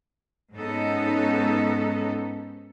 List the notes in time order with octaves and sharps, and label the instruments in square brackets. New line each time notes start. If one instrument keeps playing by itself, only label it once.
[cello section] G#2 B3 C#4 D#4 A4